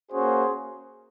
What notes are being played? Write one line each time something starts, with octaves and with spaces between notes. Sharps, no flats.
A#3 C#4 F#4 G#4 C5